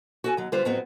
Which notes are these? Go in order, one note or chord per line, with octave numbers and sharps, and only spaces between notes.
F#4 A4 G#5
D#2 F#3
D3 G3 F4 B4 C5
F2 A2 F#3 B3 C4